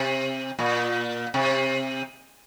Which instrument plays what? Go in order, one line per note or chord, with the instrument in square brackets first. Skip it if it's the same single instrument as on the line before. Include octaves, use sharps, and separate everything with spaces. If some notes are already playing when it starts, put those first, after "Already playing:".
Already playing: [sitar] C3
A#2
C3